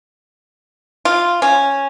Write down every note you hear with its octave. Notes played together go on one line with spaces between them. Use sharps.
F4
C#4